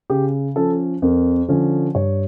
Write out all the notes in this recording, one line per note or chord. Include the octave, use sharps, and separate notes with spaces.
C#3 G4
F3 C#4 A4
F2 A#4
D3 F3 C#4
G2 C#5